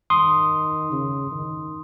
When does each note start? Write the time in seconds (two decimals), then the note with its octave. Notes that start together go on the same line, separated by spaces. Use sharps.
0.10 D#3 C6 D#6
0.92 C#3
1.32 D#3